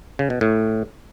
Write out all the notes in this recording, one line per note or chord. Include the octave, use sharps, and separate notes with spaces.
C#3
B2
A2